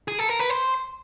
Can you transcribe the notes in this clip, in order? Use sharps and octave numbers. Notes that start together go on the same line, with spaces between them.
G#4
A4
A#4
B4
C5